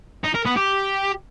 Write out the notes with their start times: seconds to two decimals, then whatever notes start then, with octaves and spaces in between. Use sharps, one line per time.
0.24 D#4
0.34 A#4
0.45 B3
0.56 G4